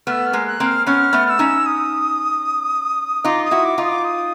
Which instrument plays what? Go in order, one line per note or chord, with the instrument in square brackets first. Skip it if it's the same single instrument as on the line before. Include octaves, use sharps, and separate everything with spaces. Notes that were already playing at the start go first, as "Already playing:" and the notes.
[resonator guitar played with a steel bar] A3 B3 [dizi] F6
[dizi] E6
F6
[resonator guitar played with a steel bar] G#3 A#3
[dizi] F#6
[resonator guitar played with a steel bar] A#3 C4
[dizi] F6
[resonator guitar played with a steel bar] B3 C#4 [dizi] F6
[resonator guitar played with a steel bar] A3 B3
[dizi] F6
E6
[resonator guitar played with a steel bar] C#4 D#4
[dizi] D#6
[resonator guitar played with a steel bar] D#4 F4 [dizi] D6
[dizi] D#6
[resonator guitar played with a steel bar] E4 F#4
[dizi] D6
[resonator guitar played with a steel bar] D#4 F4
[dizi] D#6
D6
D#6